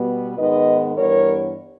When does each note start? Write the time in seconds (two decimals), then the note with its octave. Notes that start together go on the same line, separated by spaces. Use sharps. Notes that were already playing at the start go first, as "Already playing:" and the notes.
Already playing: B2 G3 B3
0.38 G#2 D#3 G#3 B3 B4 D#5
0.95 G2 E3 G3 B3 A#4 C#5